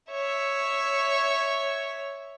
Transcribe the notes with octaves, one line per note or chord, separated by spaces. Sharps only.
C#5 E5